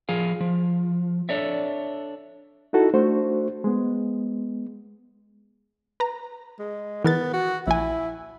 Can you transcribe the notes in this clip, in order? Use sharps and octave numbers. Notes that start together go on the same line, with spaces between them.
F3 G#4 F5
F3
D4 A4 C#5 D5 E5
D#4 E4 F#4 A4
A3 D4 F#4 C5
G#3 B3
B4 A#5
G#3
E3 B3 A#4 A6
F#4
A#1 E4 G#5